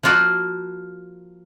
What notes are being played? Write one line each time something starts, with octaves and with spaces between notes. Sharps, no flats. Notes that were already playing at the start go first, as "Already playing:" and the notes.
F3 A#3 F4 F#4 D5